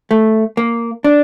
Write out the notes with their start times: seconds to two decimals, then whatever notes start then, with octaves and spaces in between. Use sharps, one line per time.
0.11 A3
0.57 A#3
1.04 D4